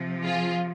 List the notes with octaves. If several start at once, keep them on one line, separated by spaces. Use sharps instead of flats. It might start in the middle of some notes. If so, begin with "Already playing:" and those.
Already playing: C3 F3
F4 G#4